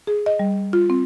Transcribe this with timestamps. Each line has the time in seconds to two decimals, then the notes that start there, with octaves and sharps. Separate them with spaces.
0.07 G#4
0.26 D#5
0.39 G3
0.73 F4
0.90 C4